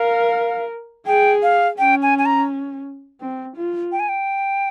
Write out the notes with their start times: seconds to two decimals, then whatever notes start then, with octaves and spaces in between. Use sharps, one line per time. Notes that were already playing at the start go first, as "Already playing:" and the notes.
Already playing: A#4 F5
1.07 G#4 G5
1.43 F5
1.78 C#4 G5
2.02 G#5
2.19 G#5
2.26 A#5
3.21 C4
3.57 F4
3.92 G5
4.00 G#5
4.09 G5